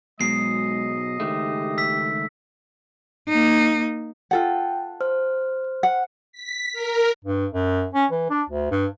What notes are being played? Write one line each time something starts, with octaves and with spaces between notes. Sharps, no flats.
G#2 B2 F#3 G#3 D#5 C7
C#2 D#3 A3 G4
E6 B6
A#3 D#4
F4 A4 F#5 G5
C5 F6
F#5
B6
A#4
G2
F#2
C#4
E3
D4
D2
G2